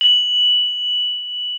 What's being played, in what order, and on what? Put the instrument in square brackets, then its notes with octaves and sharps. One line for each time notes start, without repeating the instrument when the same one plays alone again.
[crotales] F#7